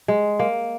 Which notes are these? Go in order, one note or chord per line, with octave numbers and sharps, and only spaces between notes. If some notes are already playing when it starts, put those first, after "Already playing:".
G#3
A#3